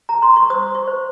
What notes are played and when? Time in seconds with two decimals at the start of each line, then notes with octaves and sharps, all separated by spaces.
0.09 A#5
0.22 C6
0.36 C#6
0.50 C5 D#6
0.75 C#6
0.88 C5